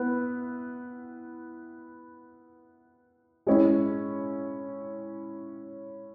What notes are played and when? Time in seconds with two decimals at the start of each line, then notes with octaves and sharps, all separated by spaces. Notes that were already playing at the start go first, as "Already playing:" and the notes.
Already playing: B3 E4 B4
3.47 G#3 C#4 E4